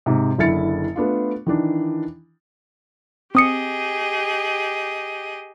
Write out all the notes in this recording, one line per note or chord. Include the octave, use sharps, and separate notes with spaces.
G#2 C3
F#1 D3 E4 E5 A6 C#7
A3 B3 D4 F4
D#3 E3 D4
C4 G4 G#4 D#5 D#6 C#7